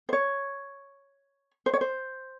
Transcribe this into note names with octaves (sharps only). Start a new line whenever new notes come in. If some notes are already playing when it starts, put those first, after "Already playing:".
C5
C#5
C5
C#5
C5